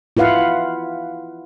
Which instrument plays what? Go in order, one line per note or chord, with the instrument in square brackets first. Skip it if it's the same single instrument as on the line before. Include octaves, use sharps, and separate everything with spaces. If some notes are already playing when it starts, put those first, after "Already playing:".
[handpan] E4 F4 B4 F5 F#5